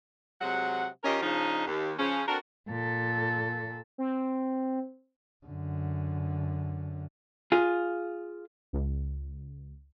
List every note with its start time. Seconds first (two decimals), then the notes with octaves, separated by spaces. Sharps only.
0.41 C3 F#3 G#3 F#5
1.04 D#3 C#4 F4 G4 A#4 D#5
1.23 C#3 F3 D4 D#4
1.67 D#2
1.99 C#3 F3 C#4
2.28 C4 D4 F#4 A4 A#4
2.68 A#2 A4
3.98 C4
5.46 F#2 D3
7.52 F4 G#4
8.73 C#2